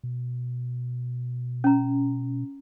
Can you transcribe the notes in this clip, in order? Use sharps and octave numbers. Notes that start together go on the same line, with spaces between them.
B2
C#4 A#5